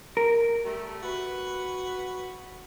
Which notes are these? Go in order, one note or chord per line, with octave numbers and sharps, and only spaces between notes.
A#4
G3 A3
F#4 B4